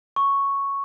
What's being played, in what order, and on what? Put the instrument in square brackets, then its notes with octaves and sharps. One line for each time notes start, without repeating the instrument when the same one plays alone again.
[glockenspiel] C#6